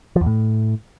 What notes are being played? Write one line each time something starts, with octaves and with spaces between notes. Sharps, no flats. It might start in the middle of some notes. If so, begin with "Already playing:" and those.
F3
E2
A2